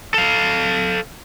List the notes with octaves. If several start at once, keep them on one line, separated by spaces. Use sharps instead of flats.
A4 F5